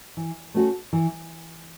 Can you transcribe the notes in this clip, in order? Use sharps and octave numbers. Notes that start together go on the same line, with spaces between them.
E3
A3 C#4 F#4 A4
E3